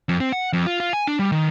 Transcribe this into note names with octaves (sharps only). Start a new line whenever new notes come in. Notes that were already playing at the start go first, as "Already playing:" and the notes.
F2
C4
F#5
F2
F4
F4
G#5
D4
G3
D#3